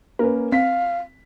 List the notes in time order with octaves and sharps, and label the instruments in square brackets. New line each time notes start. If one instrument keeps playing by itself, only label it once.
[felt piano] A#3 C#4 B4 [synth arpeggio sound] A#4
[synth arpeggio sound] C4 [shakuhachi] F5 [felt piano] B6